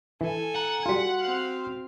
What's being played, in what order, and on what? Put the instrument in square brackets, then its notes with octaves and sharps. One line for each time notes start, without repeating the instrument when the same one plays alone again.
[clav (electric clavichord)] E3 [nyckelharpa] A4 G#5
[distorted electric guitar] F#5 [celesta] A#5
[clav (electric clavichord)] G3 F4 [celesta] F#4 C6 B6
[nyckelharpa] C4 F5